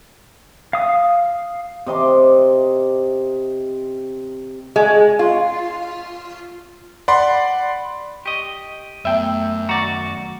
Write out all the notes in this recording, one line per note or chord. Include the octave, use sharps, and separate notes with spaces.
F5 D#6
C3 D#5 C6 D6
G#3
F4
D5 F#5 B5 C6
G4 D#5 C#6
F#2 A3 B3 E5 G5
D#3 F#4 D5 F#5 A#5 D6